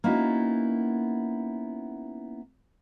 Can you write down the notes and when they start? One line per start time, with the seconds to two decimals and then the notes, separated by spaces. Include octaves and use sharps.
0.04 A#3 B3 C#4 D#4 E4 F#4